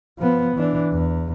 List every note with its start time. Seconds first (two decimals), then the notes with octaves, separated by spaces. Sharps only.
0.19 F3 B3
0.56 E3 D4
0.93 E2